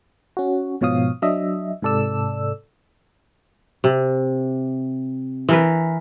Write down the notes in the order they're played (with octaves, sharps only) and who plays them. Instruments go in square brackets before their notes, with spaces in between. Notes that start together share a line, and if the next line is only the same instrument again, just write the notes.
[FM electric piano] C#4 F#4
G#2 B2 F3 C#5 F5 D#6
F#3 D4 D#5 E5
G#2 C3 A4 D5 E6
[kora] C3
E3 A#4 B4